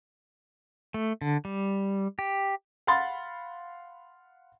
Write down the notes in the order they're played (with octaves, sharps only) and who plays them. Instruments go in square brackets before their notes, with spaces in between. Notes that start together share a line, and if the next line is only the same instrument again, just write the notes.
[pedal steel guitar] A3
D3
G3
G4
[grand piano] F5 F#5 B5 C6 A6